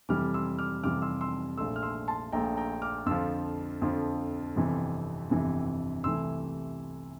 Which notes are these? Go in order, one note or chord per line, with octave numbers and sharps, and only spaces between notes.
F2 C3 E3 G3 D6 F6
C6 E6
D6 F6
F2 C3 E3 G3 D6 F6
C6 E6
C6 E6
A#1 A#2 A3 C6 E6
F6
C6 E6
A5 C6
A#1 A#2 A3 G5 A#5
G5 A#5
D6 F6
F2 D3 F3 C6 E6
F2 D3 F3
G1 F2 C3 E3
G1 F2 C3 E3
C2 C3 E3 A3 C6 E6